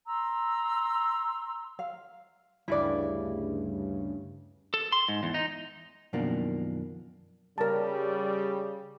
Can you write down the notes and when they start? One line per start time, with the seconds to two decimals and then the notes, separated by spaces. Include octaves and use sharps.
0.07 A#5 C6 E6
1.79 F5
2.68 D2 G2 C#3 E4 D5
4.74 A4
4.92 C6
5.08 G#2
5.23 E2
5.34 D#4
6.13 F#2 B2 D#3 F3 A#3 D4
7.58 C#3 G3 A#4 A5